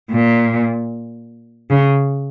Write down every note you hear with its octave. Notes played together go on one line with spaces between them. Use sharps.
A#2
C#3